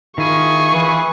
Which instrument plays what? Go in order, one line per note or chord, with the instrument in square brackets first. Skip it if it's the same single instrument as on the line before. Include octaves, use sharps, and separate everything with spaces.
[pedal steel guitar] D#3 [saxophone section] E4 F4 G#4 [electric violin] C#6
[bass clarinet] E3